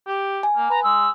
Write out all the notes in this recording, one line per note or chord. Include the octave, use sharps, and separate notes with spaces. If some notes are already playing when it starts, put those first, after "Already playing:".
G4
G#5
A#3
B4 A#5
G#3 E6